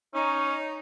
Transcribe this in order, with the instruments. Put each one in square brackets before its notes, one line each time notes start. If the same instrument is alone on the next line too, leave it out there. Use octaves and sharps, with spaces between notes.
[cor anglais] C#4 [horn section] D#4